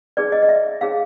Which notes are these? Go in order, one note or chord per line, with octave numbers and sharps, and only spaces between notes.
D#4 G#4 B4 D5
D#5
D#5
E5
D#4 G#4 C#5 F5